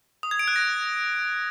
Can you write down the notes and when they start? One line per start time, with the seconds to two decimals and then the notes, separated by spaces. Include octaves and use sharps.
0.23 D#6
0.31 G#6
0.39 D7
0.48 F#6
0.56 A#6